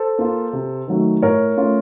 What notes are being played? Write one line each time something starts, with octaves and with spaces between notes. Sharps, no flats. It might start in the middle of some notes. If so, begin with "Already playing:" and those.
Already playing: A4 C5
A#3 F4
C3
D#3 F#3 A3
A2 A#4 C#5
A3 C#4 F4